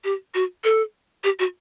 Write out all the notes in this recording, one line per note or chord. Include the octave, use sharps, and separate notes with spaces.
G4
F#4
A4
G4
F#4